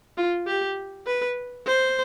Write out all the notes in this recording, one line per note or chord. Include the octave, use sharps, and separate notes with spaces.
F4
G4
B4
C5